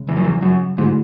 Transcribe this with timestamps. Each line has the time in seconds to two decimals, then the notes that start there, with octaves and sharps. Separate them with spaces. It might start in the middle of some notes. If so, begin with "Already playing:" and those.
Already playing: C#3 G#3
0.09 E2
0.17 F#2
0.25 E2
0.42 F#2
0.77 G#2 D3 F#3 A3 E4